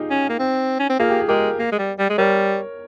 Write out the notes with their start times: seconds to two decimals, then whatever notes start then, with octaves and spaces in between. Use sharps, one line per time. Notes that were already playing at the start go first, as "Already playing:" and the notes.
Already playing: D#4 F4 G4 G#4
0.10 C#4
0.30 A#3
0.39 C4
0.79 C#4
0.89 C4
0.99 A#3 F4 G#4
1.10 G4
1.20 G#4
1.28 G#3 G4 A#4
1.59 A#3
1.72 G#3
1.79 G3
1.99 G3
2.10 G#3
2.18 G3 A#4 C#5